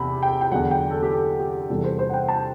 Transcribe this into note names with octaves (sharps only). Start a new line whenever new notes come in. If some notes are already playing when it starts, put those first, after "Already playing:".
Already playing: E2 C3 B5
G5
G5
E2 D3 F#3 F#5
G5
A4
G4
A4
G4
E2 C3 E3 G3 A4
C5
C5
F#5
G5
A5